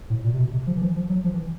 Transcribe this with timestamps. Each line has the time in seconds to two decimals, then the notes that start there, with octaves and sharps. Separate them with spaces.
0.10 A2
0.24 A#2
0.33 C3
0.39 B2
0.53 C3
0.67 F3
0.77 E3
0.82 F3
0.96 F3
1.10 F#3
1.24 F3
1.34 E3